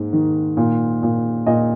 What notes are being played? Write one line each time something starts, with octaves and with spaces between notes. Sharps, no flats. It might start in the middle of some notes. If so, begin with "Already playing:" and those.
Already playing: G#2 A#3
D#3
A#2
A#2
A#2 D#5